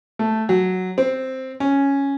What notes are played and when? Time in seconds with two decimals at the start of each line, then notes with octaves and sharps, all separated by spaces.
0.19 A3
0.49 F#3
0.98 C4
1.60 C#4